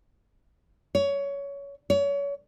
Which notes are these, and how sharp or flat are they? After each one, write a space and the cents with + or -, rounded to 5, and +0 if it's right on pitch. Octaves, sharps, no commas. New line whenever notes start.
C#5 +20
C#5 +30